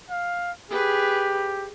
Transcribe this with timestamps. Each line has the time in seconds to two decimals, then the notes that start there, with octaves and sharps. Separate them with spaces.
0.11 F5
0.71 G4 G#4 B4